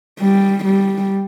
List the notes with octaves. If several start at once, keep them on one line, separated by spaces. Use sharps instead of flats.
G3
G3